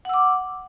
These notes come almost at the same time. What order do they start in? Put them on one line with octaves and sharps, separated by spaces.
F#5 E6 D6